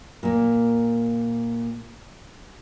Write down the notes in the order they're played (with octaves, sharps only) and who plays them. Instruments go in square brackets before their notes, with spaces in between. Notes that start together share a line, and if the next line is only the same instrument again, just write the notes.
[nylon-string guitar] A#2 A#3